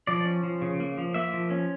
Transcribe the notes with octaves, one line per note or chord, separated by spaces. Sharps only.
F3 D5
C#4
F3
C#3
A#3
F3
A#3 E5
F3
C#4